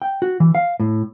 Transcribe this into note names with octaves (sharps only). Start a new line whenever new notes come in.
G5
F#4
E3
F5
A2